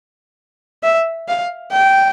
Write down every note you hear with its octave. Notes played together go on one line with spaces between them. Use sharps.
E5
F5
G5